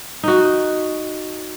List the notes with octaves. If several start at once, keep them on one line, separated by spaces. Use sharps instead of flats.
D#4 F#4